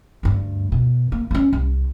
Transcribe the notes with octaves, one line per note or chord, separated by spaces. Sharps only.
D2 G2
B2
A#3
B3 C#4
C2